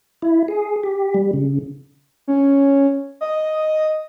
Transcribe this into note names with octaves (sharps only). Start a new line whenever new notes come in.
E4
G#4
G4
G3
C#3
C#4
D#5